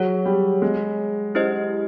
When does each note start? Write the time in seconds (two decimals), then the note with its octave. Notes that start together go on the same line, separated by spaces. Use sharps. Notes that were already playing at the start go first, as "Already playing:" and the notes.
Already playing: F#3 G#4 C#5 F#5
0.25 G3
0.62 G#3
1.35 C#4 E4 G4 C5 D#5